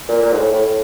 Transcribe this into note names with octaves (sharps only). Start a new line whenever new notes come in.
A#2
A#2
G#2
A2
A2
A2